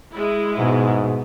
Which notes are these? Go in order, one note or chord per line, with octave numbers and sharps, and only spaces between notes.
G#3 E4
G#2 B2